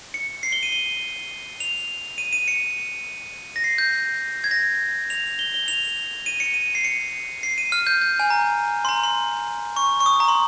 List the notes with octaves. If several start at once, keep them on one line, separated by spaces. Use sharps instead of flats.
C#7
C7
G7
D#7
G7
F7
D#7
D#7
C#7
A#6
C7
G6
G#6
A#6
F7
G7
G7
F7
D#7
C#7
D#7
C7
C#7
C7
D#7
F6
G6
G6
G#5
A#5
C6
A#5
C6
C#6
C#6
D#6
A#5
C6